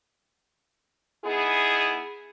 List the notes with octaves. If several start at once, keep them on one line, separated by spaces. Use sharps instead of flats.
B3 D#4 E4 G#4